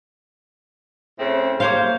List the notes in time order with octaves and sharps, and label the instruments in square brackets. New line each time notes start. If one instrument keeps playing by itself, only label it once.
[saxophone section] A2 C#3 C4
[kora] A#3 C#5 F5 [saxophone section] C5